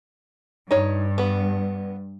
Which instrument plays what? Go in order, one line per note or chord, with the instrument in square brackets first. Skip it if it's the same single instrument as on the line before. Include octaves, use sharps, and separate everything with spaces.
[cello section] G2 [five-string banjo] D#4 C#5
[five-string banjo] B3 B4